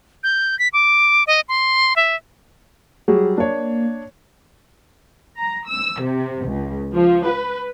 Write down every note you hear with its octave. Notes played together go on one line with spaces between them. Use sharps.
G6
B6
D6
D#5
C6
E5
F#3 G3 G#4
A#3 D4 C#5
A#5
E6
C3
C#2
F3
B4